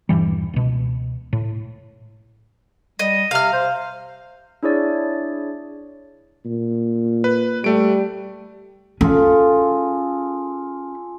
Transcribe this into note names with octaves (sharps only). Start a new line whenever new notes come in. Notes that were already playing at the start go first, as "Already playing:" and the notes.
D#1 G2 E3 G3
C#2 B2
A2
G3 D#5
C3 F5 F6
C5
D4 E4 G#4 C#5 D5
A#2
B4
G3 A3 D7
C#4 F4 G#4 A4